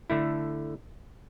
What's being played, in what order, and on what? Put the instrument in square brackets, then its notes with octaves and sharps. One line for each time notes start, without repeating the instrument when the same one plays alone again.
[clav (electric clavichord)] D3 A3 E4